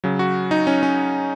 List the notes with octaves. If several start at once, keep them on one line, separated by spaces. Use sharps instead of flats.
C#3 F#3
F#4
D#4
C#4
C#4